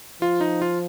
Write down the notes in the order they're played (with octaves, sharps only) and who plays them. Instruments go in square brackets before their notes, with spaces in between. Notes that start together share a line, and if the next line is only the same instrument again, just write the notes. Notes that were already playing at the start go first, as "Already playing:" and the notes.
[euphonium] F3 [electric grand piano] F4
[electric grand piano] D#4
F4